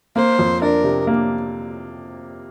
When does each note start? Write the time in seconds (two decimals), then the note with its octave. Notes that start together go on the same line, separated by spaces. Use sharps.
0.16 A#3 C5
0.39 F2
0.62 D4 A#4
0.84 C3
1.07 A#3